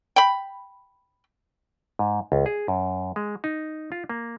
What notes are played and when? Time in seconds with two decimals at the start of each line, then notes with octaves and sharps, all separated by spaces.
0.16 G5 B5
1.99 G#2
2.32 C#2
2.46 G#4
2.68 F#2
3.16 G#3
3.44 D#4
3.92 F4
4.09 A#3